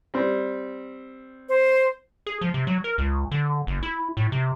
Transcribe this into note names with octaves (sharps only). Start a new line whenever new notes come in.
G3 C4
C5
G#4
F3
C3
F#3
A#4
C#2
D3
F#1
E4
A2
C3